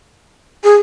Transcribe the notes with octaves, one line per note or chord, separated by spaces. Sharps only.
G#4